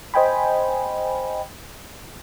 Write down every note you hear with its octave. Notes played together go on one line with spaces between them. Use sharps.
C5 D#5 G5 G#5 B5